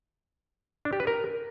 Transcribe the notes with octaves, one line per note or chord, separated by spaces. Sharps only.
D4
G4
B4
A#4